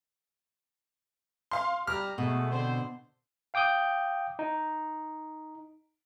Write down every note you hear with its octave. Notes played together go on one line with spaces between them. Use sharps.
F5 C6
G3 G4 A#5 F6
B2 G#3 A3
D3 C4 C5
F5 G5 D6 D#6 G6
D#4